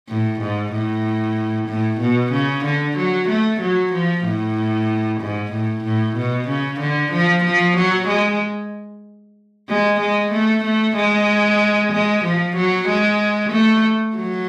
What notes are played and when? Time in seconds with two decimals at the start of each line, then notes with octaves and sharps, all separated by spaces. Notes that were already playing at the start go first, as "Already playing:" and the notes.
0.09 A2
0.41 G#2
0.73 A2
1.68 A2
2.01 B2
2.33 C#3
2.65 D3
2.97 F#3
3.29 A3
3.61 F#3
3.93 F3
4.25 A2
5.21 G#2
5.53 A2
5.85 A2
6.17 B2
6.49 C#3
6.81 D3
7.13 F3
7.45 F3
7.77 F#3
8.08 G#3
9.69 G#3
10.01 G#3
10.33 A3
10.65 A3
10.97 G#3
11.93 G#3
12.25 F3
12.57 F#3
12.89 G#3
13.52 A3
14.17 F#3